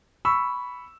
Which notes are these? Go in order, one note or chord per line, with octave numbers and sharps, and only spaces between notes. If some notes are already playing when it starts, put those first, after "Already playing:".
B5 C#6 E6